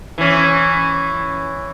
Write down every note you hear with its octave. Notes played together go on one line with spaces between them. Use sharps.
E3 C#4